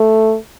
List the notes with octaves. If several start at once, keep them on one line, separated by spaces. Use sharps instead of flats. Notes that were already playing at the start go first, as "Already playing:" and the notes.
Already playing: A3